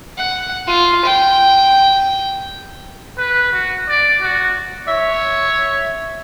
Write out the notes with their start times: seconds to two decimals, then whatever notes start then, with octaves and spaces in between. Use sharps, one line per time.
0.18 F#5
0.68 F4
1.05 G5
3.18 B4
3.53 F#4
3.89 D5
4.22 F#4
4.88 C#5 E5